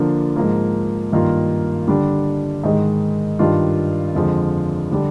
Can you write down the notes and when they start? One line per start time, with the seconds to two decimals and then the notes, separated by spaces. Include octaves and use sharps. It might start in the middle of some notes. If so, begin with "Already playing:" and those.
Already playing: D3 F3 A#3 D4
0.36 G#2 F3 A#3
1.12 G2 D#3 A#3 F4
1.87 D3 G3 D4
2.64 G#2 D#3 G#3
3.39 G2 D#3 G3 D4 F4
4.15 F2 D3 F3 G#3
4.91 D3 G3 D4